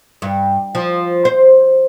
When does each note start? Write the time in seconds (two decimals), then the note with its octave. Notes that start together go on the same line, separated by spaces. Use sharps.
0.22 G2
0.75 F3
1.25 C5